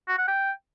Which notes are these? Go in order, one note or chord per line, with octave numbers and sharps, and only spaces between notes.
F#4
F#5
G5